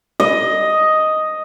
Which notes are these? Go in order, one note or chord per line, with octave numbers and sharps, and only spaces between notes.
D#5